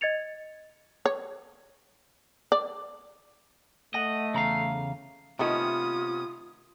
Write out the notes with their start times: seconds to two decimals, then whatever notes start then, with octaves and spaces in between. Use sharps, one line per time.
0.01 D#5 G#6 A6 C#7 F7
1.05 C#5
2.52 D5
3.94 A3 D#5 F#5
4.34 E2 C#3 F5 A#5
5.39 C3 D#3 A3 B3 C#4 E4 F4 D#6